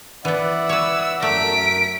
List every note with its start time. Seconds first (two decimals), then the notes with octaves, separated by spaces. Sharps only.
0.25 E3 B3 D5 E5 F#5
0.69 B4 C#5 E6
1.22 F#2 A3 A#4 B6 D7